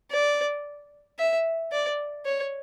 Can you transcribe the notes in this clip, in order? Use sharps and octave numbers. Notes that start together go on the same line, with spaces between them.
D5
E5
D5
C#5